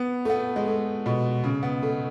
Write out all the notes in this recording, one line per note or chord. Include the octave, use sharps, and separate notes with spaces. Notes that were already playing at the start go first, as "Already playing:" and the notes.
Already playing: B3
A3
B3
G#3
A3
B2
C#3
B3
A3